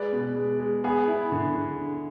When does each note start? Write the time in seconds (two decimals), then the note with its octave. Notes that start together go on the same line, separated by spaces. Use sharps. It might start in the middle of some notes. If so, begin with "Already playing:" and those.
Already playing: G#3 B4 D5
0.12 B2
0.36 G#3
0.59 G#3
0.84 B3 G#4
1.07 E4
1.32 D3
1.55 D3